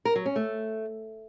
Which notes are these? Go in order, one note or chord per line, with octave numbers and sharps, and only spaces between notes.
A#4
F#3
C#4
A3